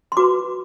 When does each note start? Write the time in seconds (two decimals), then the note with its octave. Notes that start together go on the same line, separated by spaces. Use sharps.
0.12 C6
0.17 F#4 B4 D6